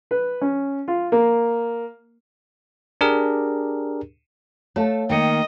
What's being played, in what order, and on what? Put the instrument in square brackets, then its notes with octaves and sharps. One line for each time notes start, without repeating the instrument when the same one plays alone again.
[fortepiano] B4
C#4
F4
A#3
[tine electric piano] D4 G4 G#4 A#4
[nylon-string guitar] A3 A4 [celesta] C#5 F5 A5
[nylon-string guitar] D#3 A#3 [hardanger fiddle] D#5 [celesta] G5 C#7